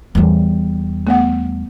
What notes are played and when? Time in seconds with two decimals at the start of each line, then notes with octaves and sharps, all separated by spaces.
0.15 E2 G3
1.07 A3 B3 F#5